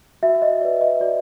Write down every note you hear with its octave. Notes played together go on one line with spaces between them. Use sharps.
F#4 E5
E5
D#5
B4 D5
D#5
F#4 D5